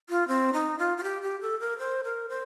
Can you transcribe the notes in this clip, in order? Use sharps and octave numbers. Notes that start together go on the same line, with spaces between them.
F4
C4
D#4
F4
F4
G4
G4
A4
A#4
C5
A#4
C5